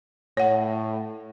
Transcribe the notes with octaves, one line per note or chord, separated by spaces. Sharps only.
A2 C#5 F#5